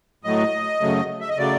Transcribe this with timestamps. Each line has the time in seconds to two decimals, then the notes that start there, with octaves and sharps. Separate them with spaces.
0.24 A2 F#3 A3 D#5
0.81 F#2 C#3 F#3 A3
1.21 E5
1.29 D#5
1.38 C#3 F#3 A3 D5